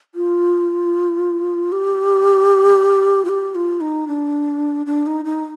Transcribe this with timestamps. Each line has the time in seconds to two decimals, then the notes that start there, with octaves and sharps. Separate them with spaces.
0.15 F4
1.72 G4
3.25 F4
3.29 G4
3.55 F4
3.81 D#4
4.08 D4
4.86 D4
5.06 D#4
5.25 D#4